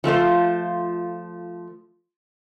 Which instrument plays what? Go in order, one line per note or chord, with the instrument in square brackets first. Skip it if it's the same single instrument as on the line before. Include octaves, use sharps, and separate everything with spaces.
[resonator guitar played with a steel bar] F3 A3 F4 C5